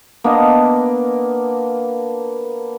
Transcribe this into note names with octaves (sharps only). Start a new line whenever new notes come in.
A#3 B3 D4 D#5